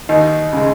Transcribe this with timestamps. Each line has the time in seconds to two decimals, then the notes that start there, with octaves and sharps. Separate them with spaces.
0.09 D#2 D#4
0.53 C#3 G#3